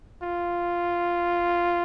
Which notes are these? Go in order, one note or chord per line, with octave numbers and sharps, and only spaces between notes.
F4